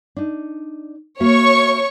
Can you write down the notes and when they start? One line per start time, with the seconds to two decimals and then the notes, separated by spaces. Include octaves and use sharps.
0.17 D4 D#4
1.20 A#3 F#4 C#5 E5 C#6